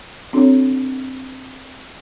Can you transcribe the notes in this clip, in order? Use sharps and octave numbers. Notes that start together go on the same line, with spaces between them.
C4 D4 F#4 A4 C#5